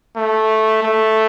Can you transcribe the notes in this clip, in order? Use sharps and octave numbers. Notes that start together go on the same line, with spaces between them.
A3
A3